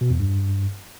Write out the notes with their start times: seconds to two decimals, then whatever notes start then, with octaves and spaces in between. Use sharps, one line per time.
0.01 B2
0.10 E2
0.20 G2